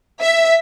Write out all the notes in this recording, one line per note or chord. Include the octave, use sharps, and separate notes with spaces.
E5